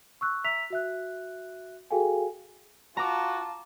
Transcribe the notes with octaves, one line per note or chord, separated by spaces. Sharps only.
C#6 E6 F#6
E5 A#5 E6 B6 F7
F#4 E5 F#6
F#4 G#4 A4 F5 G5 G#5
F4 F#4 A5 A#5 D6